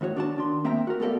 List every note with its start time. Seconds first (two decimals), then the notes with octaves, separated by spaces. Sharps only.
0.01 D#2 A2 F#4 C#5
0.16 D4 F#4 A5
0.36 D#3 D4 C6
0.64 A#3 C4 E5 G5 A#5
0.87 F#4 A#4
1.00 A3 B3 G4 A4 D5 F5